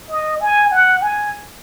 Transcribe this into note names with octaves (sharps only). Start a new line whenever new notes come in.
D#5
G#5
F#5
G#5